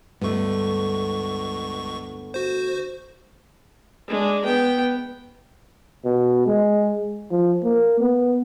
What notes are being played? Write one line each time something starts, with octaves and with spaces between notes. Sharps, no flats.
C#2 G2 D3 A3 B3 C#6
F#4 C5
G#3 D4
B3 G5
B2
G#3
F3
A#3
B3